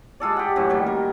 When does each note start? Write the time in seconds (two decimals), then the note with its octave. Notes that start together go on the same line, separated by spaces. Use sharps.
0.20 G#3 F4 A4 D5
0.37 G4 F#5
0.56 F#2 A2 E3
0.69 A#2 D#3 G3
0.86 A#4